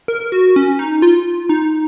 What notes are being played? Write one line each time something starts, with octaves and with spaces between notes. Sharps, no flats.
A#4
F#4
C#4
D#4
F4
D#4